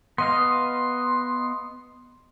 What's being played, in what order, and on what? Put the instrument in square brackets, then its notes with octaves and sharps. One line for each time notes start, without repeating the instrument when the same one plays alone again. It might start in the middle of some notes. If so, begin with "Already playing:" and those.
[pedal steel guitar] B3 D#5 F5 [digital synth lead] C6